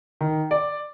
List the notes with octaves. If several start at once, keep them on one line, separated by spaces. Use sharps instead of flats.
D#3
D5